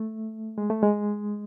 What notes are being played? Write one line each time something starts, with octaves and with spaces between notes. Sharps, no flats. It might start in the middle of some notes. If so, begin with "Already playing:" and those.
Already playing: A3
G#3
A3
G#3